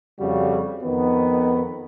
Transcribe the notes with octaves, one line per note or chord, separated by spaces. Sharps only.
F2 C#3 G3 F#4
F2 D#3 B3